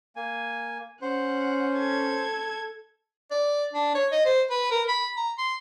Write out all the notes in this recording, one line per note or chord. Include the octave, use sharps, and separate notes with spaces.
A#3 G#5
C#4 C5 F#5
A4 G#6
D5
D4
C#5
D#5
C5
B4
A#4
B5
A#5
C6